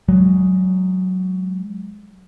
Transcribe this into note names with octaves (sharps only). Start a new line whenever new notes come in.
F#3 G#3